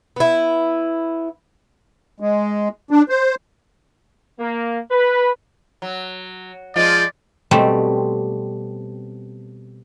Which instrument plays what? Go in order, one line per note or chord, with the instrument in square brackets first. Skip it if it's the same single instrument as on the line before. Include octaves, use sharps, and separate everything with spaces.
[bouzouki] B3 E4
[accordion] G#3
D4
C5
[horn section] A#3
B4
[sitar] F#3
[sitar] F3 G#3 F4 [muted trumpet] D5
[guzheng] B2 G3 A3 C4